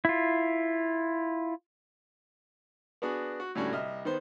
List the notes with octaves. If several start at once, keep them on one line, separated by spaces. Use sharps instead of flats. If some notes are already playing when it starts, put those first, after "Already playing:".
E4 F4
B3 D4 F#4 G#4
F#4
A2 D3 G3 C#4 F#4
C2 D#5 E5 F6
D#3 B3 C5